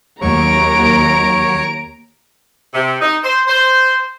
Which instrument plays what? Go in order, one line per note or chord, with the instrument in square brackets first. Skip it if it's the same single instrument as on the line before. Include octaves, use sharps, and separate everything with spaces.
[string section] D#2 [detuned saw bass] F#3 [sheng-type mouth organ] C#5 C#6 [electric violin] A#5 D7
[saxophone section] C3
D#4
C5
C5